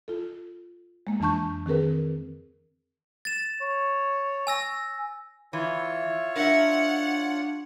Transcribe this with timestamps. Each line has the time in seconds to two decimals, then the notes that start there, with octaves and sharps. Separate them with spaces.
0.08 F4 A4
1.07 G#3 A#3
1.20 F2 E3 D4 A5 C#6 G6
1.66 D#3 C4 G#4 A#4 B4
3.25 A6 E7
3.62 C#5
4.47 G#5 E6 A#6
5.53 E3 F4 C#5 E5
6.36 D4 A#4 E5 F#5